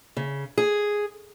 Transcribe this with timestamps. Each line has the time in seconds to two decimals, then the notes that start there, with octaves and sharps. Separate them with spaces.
0.17 C#3
0.58 G#4